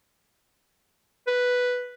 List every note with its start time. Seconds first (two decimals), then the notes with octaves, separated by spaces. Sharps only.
1.27 B4